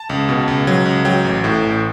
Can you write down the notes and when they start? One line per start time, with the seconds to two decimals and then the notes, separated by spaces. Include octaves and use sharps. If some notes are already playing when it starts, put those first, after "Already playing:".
Already playing: A5
0.09 C#2
0.29 B2
0.48 C#2
0.67 F#3
0.85 C#2
1.05 F#3 G5
1.25 A1
1.44 A2
1.63 A1